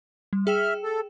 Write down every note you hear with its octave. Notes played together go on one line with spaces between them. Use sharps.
G3
G#4 E5 G5 F6 E7
A4